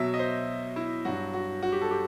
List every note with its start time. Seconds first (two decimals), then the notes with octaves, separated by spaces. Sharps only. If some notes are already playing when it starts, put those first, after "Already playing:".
Already playing: B2 F#3 E5
0.14 D#5
0.19 C5
0.76 E4
1.05 G2 F#3 F#4
1.34 F#4
1.63 F#4
1.72 G4
1.82 A4
1.91 G4